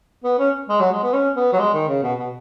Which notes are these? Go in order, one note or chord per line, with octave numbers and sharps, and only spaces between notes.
B3
C#4
G#3
F#3
G#3
B3
C#4
B3
F#3
G#3
D#3
C#3
B2
B2